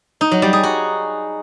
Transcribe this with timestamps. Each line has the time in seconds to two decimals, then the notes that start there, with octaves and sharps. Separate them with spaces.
0.21 D#4
0.32 F#3
0.42 G3
0.53 G#4
0.63 F#4